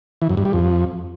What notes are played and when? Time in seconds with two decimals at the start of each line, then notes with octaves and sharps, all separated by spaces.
0.22 E3
0.29 F#2
0.37 G2
0.45 G3
0.53 F2